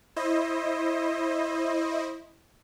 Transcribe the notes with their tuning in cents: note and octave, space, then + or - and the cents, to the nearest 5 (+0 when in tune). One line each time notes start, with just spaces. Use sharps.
E4 +0 C5 +30 D#5 +0